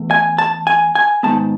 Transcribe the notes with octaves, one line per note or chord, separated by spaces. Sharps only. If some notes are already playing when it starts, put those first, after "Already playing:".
Already playing: E2 A3
G#5
A5
G#5
G#5
G#2 D#3 G#3 B3 A5